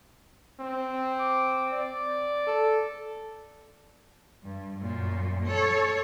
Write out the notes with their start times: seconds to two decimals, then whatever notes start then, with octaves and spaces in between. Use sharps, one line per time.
0.61 C4
1.19 D6
1.72 D5
2.47 A4
4.43 G2
4.80 F#2 A#2
5.46 A4 C#5